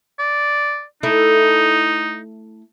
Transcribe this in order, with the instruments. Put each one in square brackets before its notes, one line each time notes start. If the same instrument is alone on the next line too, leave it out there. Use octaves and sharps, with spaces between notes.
[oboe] D5
[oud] A3 E4 [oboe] D#4